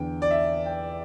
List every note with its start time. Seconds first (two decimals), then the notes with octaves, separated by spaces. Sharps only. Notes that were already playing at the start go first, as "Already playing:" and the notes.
Already playing: E2 D3 G5
0.22 D5
0.31 E5
0.66 G5